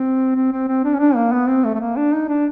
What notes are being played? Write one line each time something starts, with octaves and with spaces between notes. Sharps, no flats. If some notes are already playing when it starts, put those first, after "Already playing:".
Already playing: C4
C4
C4
C4
D4
C#4
D4
A#3
B3
C4
A3
A3
A#3
D4
D#4
D4